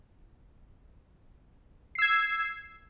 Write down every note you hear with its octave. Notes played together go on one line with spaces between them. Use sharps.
E6 G#6 C7